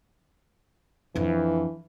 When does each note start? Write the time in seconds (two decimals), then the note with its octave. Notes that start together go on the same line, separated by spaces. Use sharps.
1.16 F2 E3 D4